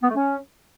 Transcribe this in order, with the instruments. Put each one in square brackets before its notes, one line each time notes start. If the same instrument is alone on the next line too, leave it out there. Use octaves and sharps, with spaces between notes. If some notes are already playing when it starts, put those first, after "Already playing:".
[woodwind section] B3
A3
C#4